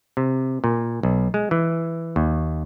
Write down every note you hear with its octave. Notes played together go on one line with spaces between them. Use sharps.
C3
A#2
B1
G#3
E3
D#2